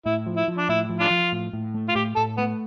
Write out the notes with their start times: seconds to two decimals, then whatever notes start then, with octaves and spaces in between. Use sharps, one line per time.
0.05 A2 E4
0.26 F3
0.37 E4
0.48 F3
0.58 D4
0.69 A2 E4
0.89 F3
1.00 D4 F4
1.10 F3
1.32 A2
1.53 A2
1.74 A3
1.89 F4
1.95 A2 G4
2.16 A2 A4
2.37 A3 B3